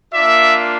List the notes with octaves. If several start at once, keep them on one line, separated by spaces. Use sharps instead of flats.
A#3 D4 F4 D5 E5